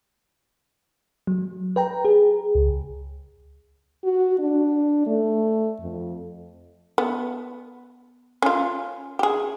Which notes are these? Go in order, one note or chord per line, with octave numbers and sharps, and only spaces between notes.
F#3
B4 G5 A#5
G#4
C#2
F#4
D4
A3
F2
B3
C#4 F4
G4 G#4